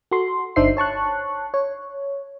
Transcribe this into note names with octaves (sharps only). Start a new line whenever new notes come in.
F#4 A4 C6
G1 D4 D#4 C5 E5 C7
C#5 A5 C#6 F#6
C#5